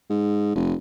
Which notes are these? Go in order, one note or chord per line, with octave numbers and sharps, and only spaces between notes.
G#2
F1